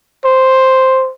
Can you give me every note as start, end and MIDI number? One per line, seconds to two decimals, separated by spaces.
0.25 1.11 72